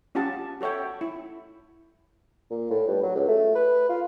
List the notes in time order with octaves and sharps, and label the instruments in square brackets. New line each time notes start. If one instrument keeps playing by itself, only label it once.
[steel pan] C#4 F4 G4 F#5 A5
F#4 A4 C#5 E5 G5
E4
[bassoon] A#2
A2
G2
F#3
C#2
A3
B4
F4